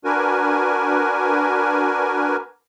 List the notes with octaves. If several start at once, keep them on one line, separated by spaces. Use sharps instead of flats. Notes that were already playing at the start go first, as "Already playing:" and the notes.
D4 F#4 A#4 B4 G#5